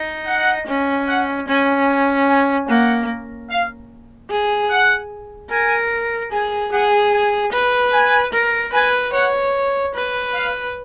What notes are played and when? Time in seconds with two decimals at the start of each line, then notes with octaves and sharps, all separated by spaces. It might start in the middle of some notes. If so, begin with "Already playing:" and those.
Already playing: D#4
0.27 F#5
0.67 C#4
1.08 F#5
1.48 C#4 G#5
1.88 G#5
2.29 G#5
2.69 A#3 F#5
3.50 F5
4.30 G#4
4.70 F#5
5.50 A#4 G#5
6.31 G#4 G#5
6.72 G#4 F#5
7.13 G#5
7.53 B4
7.92 G#5
8.33 A#4
8.73 B4 G#5
9.13 C#5 F#5
9.95 B4
10.34 F5